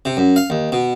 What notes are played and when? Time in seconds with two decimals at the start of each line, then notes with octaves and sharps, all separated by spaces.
0.05 C3
0.17 F#2
0.36 F5
0.50 D#2
0.72 B2